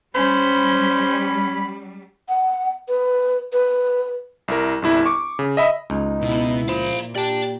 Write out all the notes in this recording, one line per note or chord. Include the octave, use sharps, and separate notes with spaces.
G3 C#4 C5 B5
F#5
B4
B4
C2 E4 A#4
G1 C2 E4
C#6 D6
C#3
D#5 E5 B5
C#2 D#4
B2 B3 E4
A#2 F3 F5 B5
G4 D5 A5